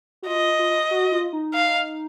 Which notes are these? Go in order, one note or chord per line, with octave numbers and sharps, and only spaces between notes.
F#4
F4 D#5
F4
F#4
F4
D#4
F5